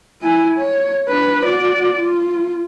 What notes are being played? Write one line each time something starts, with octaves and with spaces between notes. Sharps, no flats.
E4 G#5
C#5
D4 B4
F#4 D5
F4